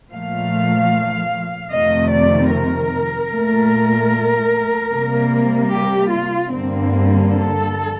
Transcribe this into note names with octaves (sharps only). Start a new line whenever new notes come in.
A#2 F3 A3 F5
F2 C3 D#3 A3 D#5
D5
A#4
A#2 A3
C3 G3 A#3
G4
F4
G2 D3 G3 A#3 C4
A4